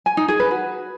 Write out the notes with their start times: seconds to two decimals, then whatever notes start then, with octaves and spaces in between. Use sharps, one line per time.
0.06 G#5
0.17 D#4
0.28 G#4
0.40 B4
0.51 F#4